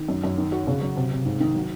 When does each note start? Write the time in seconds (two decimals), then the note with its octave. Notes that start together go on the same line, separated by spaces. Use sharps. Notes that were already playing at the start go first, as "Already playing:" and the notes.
Already playing: D#3
0.08 F#2
0.23 F#2
0.38 D#3
0.52 F#4
0.67 C#3
0.81 F#3
0.96 C3
1.11 C3
1.25 G#2
1.40 D#3
1.55 F#3